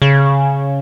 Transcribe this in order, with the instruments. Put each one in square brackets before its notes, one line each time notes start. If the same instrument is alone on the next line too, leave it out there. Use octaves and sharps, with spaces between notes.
[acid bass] C#3